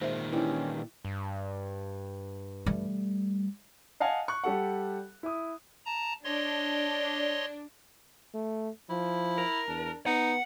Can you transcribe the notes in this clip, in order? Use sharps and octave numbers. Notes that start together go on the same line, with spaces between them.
A#2 D#3 G#3 C5 E5
E3 C#4 D4 E4 G4
G2
G3 A3
D#5 F5 F#5 G#5 A5
C#6 F#6
G3 G4 A4 F#5
E4 D#6
A5 A#5
D4 C#5 D#5 C6
A3
F3 E4
A#4
E2 D4
B3 D#4 F#5